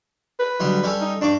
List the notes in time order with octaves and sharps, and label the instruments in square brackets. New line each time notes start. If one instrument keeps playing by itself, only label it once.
[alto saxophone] B4
[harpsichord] B1 D3 G3
G3 C#4 A4
[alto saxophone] D#4
[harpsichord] G2 C#6 D6 [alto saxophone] D4